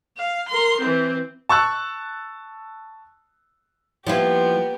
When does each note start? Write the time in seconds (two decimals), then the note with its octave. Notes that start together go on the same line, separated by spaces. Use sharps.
0.17 F5
0.49 A#4 C6
0.81 E3 C4
1.49 A5 C#6 E6 F#6
4.07 F3 A#3 B3 E4 F4 G4